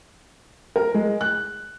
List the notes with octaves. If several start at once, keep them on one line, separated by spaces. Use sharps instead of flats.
A#4
G#3
F#6